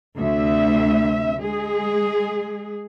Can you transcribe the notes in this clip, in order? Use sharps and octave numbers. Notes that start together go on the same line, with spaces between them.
D2 C3 E5
G#3 G#4